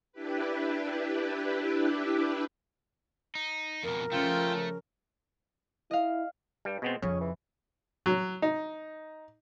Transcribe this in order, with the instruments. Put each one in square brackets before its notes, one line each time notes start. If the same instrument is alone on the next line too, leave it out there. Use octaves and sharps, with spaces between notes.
[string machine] D4 E4 G4 B4
[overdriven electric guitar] D#4
[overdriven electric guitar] F2 B2 [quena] A#4
[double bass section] C#3 F3 C#4 [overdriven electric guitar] A3 [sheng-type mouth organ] F4 G5
[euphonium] E4 [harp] D#5 F5
[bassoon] G2 [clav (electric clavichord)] G3
[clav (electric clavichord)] B2 B3 C4 [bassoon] G#3
[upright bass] F2 F3 [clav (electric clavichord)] C#3 [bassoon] C#4
[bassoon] E3
[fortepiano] F#3
D#4